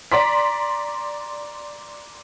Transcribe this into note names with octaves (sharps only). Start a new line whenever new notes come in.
D5 A#5 C6 B6